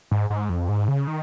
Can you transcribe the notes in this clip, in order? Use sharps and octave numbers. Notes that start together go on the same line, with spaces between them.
G#2
G#2
F2
G#2
C#3
D#3